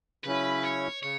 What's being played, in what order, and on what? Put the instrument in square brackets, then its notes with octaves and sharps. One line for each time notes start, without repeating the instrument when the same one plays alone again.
[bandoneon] C#3 F#3 C#4 E4 [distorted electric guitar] B4
[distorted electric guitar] C#5
[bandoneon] C#3 [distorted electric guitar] C#5